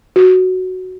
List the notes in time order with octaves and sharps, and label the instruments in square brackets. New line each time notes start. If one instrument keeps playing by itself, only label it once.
[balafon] F#4